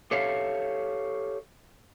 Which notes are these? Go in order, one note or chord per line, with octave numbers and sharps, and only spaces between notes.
G4 A4 C#5 E5 F5